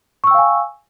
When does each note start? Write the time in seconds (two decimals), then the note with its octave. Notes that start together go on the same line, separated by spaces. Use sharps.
0.24 C#6
0.27 E6
0.31 G5
0.34 F5
0.38 G#5